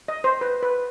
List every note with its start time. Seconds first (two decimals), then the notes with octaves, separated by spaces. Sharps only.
0.08 D#5
0.24 C5
0.41 B4
0.63 B4